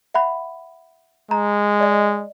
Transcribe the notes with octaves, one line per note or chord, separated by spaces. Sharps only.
E5 F#5 B5
G#3 A#5
D5 D#5